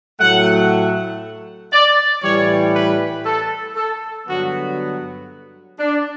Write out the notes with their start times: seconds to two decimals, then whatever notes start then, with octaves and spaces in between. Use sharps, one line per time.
0.20 A2 F#3 A3 F#5
1.73 D5
2.23 A2 E3 G3 C#5
2.75 B4
3.26 A4
3.76 A4
4.27 G2 D3 F#3 B3 F#4
5.79 D4